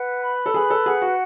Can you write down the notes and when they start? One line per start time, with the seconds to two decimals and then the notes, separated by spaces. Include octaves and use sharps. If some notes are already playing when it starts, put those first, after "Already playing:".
Already playing: B4 F#5
0.23 B5
0.46 A4
0.54 G#4 B4
0.70 A4
0.86 G#4 F#5
1.02 F#4